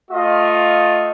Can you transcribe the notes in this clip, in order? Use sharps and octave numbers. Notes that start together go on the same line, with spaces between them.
A3 F4 D#5 F5